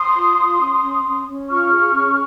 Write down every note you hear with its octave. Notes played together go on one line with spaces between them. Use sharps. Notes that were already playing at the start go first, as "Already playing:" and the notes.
Already playing: C6 D#6
F4
F4
C#4
C#4
C#4
C#4
F4 C#6 F6
G#4
C#4